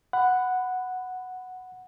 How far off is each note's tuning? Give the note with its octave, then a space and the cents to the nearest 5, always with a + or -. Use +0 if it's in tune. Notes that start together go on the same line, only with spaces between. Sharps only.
F#5 +0 B5 +20